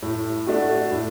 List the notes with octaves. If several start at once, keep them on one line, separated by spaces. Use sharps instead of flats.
A2
A3 D4 F#4
A2